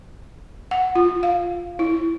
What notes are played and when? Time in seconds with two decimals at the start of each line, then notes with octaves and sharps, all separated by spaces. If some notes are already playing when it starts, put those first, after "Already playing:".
0.71 F#5
0.95 F4
1.23 F5
1.79 E4